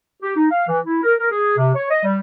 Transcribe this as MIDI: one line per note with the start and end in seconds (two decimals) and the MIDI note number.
0.22 0.35 67
0.36 0.46 63
0.51 0.66 77
0.68 0.79 52
0.85 1.01 64
1.03 1.14 70
1.19 1.27 70
1.31 1.55 68
1.57 1.72 48
1.75 1.87 73
1.91 2.02 75
2.04 2.19 55